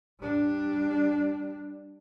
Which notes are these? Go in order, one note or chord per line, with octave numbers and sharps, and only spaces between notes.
G3 D4